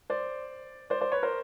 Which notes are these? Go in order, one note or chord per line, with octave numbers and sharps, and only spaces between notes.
C5 D5
C5 D5
C5 D5
B4 C#5
A#4 C5